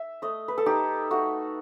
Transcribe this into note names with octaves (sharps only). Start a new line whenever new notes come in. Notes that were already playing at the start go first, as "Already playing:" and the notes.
Already playing: E5
A3 D#5
B4
A4
D#4 G4
A3 F#4